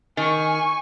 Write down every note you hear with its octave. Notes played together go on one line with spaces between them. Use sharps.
D#3 G#5 C#6